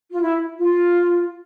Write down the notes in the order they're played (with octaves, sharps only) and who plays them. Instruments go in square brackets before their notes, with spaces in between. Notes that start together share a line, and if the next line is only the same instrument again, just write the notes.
[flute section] F4
E4
F4